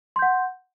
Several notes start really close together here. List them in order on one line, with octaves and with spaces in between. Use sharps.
C6 G6 F#5